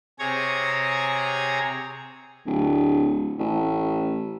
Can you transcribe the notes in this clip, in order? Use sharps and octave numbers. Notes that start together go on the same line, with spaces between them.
C3 G#4 C#5 A#5 G#6
D1
A1